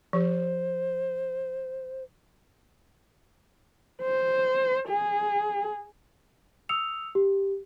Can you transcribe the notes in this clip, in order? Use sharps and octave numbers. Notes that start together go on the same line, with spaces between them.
F3 G4 C5
C5
G#4
D#6 E6 C#7 F7
G4